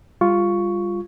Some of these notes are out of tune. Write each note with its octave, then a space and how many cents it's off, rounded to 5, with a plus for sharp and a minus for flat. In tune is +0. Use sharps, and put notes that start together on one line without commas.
G3 +30 F4 +0 C#6 +5